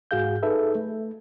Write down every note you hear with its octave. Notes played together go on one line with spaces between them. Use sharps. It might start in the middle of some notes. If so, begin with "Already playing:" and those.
G#2 F#4 G#4 F5 G6
D#4 G#4 A4 B4 E5
A3